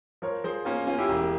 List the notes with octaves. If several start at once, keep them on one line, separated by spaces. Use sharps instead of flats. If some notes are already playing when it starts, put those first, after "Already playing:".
F3 A#4 C#5
F3 G#4 C5
A#3 C#4 F4
A#3 C#4 F4
E4 G4
E1